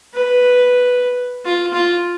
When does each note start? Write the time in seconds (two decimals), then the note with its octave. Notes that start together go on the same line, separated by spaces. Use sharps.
0.14 B4
1.45 F4
1.73 F4